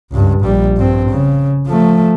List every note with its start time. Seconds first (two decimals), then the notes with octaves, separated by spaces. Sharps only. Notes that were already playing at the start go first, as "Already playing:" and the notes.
0.11 C#2 G2
0.42 A#1 G3
0.77 G2 C4
1.11 C#3
1.67 F3 A3